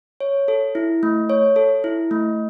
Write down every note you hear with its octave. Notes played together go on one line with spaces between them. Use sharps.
C#5
A4
E4
A3
C#5
A4
E4
A3